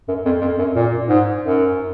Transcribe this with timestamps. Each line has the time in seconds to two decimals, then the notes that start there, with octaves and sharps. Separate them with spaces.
0.08 F#2
0.25 F2
0.41 F2
0.59 F#2
0.75 A#2
1.09 G#2
1.44 F#2